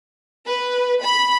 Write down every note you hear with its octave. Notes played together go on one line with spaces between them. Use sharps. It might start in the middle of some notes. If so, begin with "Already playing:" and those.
B4
B5